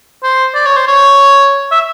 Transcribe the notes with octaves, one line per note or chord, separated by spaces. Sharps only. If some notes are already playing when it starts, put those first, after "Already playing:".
C5
D5
C#5
C5
C#5
E5